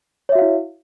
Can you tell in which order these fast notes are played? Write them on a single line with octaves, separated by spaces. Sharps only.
C#5 E5 F#4 F5 E4